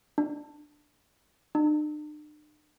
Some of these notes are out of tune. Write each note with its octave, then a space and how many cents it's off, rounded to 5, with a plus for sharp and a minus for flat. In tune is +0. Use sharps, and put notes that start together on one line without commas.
D4 +10
D4 +45